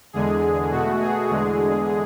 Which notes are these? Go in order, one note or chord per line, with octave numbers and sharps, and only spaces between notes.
E2 D3 G#3 G#4
B2 A3 F#4
G#4
E2 D3 G#3